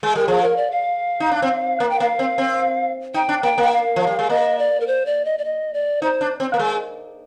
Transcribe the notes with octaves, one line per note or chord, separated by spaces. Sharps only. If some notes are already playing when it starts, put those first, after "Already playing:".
G#3
G3 A#4
F3 G#4
A#4
D5
F5
D#4
D4
C4
A#3
G5
A#3 F5
C4
C4
D#4 G5
D4
A#3 G5
A#3
G5
F5
F3
G3
G#3
A#3 D#5
D5
A#4
C5
D5
D#5
D5
D#5
D5
D#4 C5
D4
C4
A#3
G#3